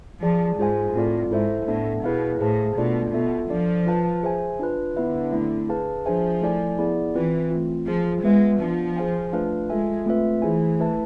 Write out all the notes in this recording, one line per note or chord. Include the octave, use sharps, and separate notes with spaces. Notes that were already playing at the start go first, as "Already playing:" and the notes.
F3 G#4 D5 A5
G#2 F4 G#4 C5 F5 G#5
A2 C4 F4 A4 D5 F5
G#2 E4 A4 C5 E5
A2 B3 D4 A4 E5
B2 E4 G#4 B4 F5
A2 G#4 C5 F5 A5
B2 A3 D4 F4 A4 D5
B2 B3 F4 A4 E5
F3 D4 A4 D5
F4 B4 F5 A5
G#4 C5 E5 G#5
D4 F4 B4
D3 B3 E4 B4 E5
A3 C4 E4
G#4 B4 F5 A5
F3 D4 G#4 C5 E5 G#5
A3 E4 A4 D5 G#5
B3 E4 G#4 D5
E3 C4 F4 B4
A3 C4 F4
F3 F4 G#4 C5
G#3 B3 F4 B4 E5
F3 B3 D4 F4
G#4 C5 F5 G#5
A3 D4 F4 B4 F5
G#3 F4 A4 E5 G#5
A3 C4 F4 B4 E5
E3 A3 E4 G#4 C5 G#5
A3 E4 B4 E5 A5